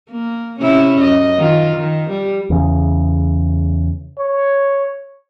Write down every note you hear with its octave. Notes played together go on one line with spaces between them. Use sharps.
A#3
C3 C#4 E4
F#2 D#5
D#3 F4
D#3
G3
E2 C#3
C#5